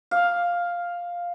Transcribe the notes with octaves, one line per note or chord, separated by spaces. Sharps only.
F5